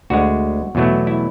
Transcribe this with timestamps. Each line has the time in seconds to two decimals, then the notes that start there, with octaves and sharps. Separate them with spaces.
0.10 D2 D3 G#3 F#4
0.75 E2 B2 F#3 A3
1.07 E4